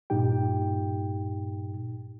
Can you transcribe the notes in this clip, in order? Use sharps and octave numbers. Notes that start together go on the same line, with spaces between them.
G2 A#2 D#4 G4 G5